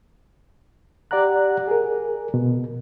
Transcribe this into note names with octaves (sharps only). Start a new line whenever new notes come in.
G4 D5 F#5 A#5 F#6
G#4 A#4
B2